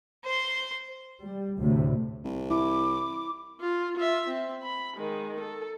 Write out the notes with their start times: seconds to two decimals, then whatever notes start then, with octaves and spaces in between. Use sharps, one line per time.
0.24 C5 C6
1.24 G3
1.59 D2 A2 C3
2.25 C2
2.51 E4 D6
3.60 F4
3.96 F4 E5
4.28 C4
4.63 B5
4.96 D#3 G#3
5.39 A4